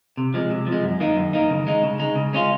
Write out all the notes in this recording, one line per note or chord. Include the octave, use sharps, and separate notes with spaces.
C3
F3 G#3
C3
F3
G#3
F#2
D#3 A#3 D#4
F#2
D#3 A#3 D#4
C#3
G#3 D#4
C#3
G#3 D#4
C#3
G#3 C#4 F4